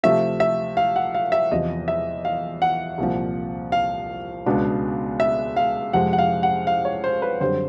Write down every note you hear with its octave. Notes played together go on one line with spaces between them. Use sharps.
C3 F3 A3 E5
E5
F5
F#5
F5
E5
E2 C3 F3 D#5
E5
F5
F#5
C2 A#2 F3
F5
C#2 B2 G#3 B3 D4
E5
F5
F2 C3 F3 G#3 F#5
F#5
F5
F#5
F5
C#5
C5
B4
F#2 D3 G3 C4 C5